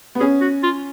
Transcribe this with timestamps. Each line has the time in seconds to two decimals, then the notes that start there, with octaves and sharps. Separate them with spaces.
0.15 B3
0.20 C#4 G#4
0.41 F#4
0.63 F4